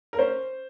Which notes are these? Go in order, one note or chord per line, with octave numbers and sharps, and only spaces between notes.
A#4
C#4 C5